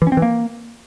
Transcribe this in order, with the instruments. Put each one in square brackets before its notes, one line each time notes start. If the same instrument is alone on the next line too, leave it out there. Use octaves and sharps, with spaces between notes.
[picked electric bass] E3
C#4
C4
E3
A#3